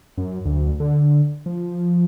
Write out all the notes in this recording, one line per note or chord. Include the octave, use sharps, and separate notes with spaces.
F#2
D2
D3
F3